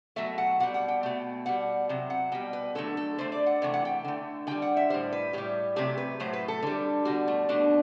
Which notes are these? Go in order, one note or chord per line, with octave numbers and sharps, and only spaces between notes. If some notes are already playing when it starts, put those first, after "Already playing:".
B2 F#3 A3 E5
F#5
B2 G3 F#5
F#5
G5
B2 A3
B2 G3 F#5
C3 F#3
F#5
B2 G3 G5
B4
D3 F#3 A3 A4
A4
D3 A3 C5
D5
F#5
C3 E3 A3
F#5
G5
D3 A3
D3 G3 G5
F#5
E5
A2 G3 C5
B4
A2 G3 G4
C3 F#3 A3 G4
B4
A2 F#3 A3 C5
B4
A4
D3 G3
B2 G3 F#4
A3
B2 A3 D4